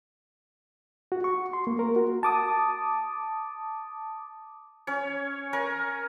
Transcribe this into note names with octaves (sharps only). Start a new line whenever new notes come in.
F#4
C#6
C6
A#3
A#4
F#4
A5 D6 D#6
C#4 C#5
A#4 C#5 G#5 C#6